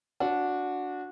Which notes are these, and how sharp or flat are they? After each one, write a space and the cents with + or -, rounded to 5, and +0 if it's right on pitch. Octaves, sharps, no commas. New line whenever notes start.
D4 -10 F#4 -20